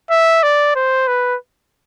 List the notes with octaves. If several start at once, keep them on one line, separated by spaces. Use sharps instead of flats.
E5
D5
C5
B4